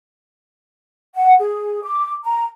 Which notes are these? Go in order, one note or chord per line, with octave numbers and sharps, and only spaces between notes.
F#5
G#4
D6
A#5